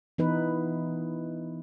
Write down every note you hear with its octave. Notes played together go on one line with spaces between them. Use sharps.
E3 B3 D#4 B4